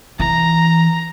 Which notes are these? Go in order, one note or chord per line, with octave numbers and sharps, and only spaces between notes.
E3 A#5